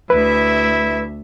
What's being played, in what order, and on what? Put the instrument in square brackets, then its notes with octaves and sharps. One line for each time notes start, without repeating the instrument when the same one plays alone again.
[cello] D2 E5 [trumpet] E4 [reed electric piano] B4